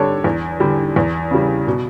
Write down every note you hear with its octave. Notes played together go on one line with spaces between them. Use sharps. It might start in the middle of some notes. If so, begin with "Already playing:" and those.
Already playing: D3 G3 D4 A4 C#5
E2
D3 G3
E2
C#3 G3
B2